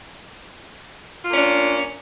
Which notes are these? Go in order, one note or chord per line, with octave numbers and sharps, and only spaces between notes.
A#3 C#4 D4 F4